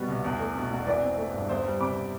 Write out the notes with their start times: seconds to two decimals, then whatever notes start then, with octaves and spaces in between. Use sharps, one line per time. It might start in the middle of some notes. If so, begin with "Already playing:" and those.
Already playing: B2 G3 B3
0.08 C2
0.24 E2
0.40 A3
0.55 B2
0.71 E1
0.86 E3 B4 D5
1.02 C4
1.18 A3
1.33 G2
1.49 E2 C5 E5
1.65 G3
1.80 C3 B5 D6